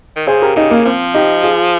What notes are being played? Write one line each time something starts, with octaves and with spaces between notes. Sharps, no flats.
D#3
C#3 G#4 C5
G4 A#4
C#3 D#4 G4
A#3
F3 C4
D#4 G4
F4 G#4